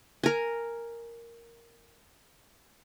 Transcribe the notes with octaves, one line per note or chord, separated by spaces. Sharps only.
A#4 G#5